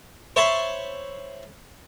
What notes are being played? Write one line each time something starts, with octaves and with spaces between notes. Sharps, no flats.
C5 C#5 E5 A5 B5 C6